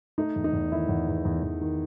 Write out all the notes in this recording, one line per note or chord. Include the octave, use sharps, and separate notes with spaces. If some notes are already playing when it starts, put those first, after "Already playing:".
A3 D#4
E2
D#4
E2
D#3 E4
E2
E2
E2
E2
D#3